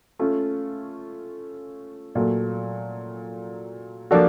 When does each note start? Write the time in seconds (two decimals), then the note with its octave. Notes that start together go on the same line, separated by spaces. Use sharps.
0.19 A3 C#4 F4
2.15 A#2 F#3 A3
4.11 F3 A#3 D4 F#4 A4